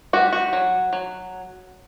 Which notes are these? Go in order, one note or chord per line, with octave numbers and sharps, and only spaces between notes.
G3 F#4
F#4
F#3
F#3